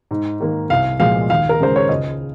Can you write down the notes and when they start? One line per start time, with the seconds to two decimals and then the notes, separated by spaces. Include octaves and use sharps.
0.11 G#2
0.41 D#3 A#3
0.70 C2 F5
1.00 A#2 F3 G#3 F5
1.30 D#2 F5
1.49 A#4
1.60 C#3 G#3 C5
1.76 C#5
1.89 C#2 D#5